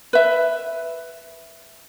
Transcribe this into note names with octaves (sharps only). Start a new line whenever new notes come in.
B4 E5